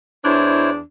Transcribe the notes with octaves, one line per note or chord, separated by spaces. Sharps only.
E2 D4 E4 C5 C#5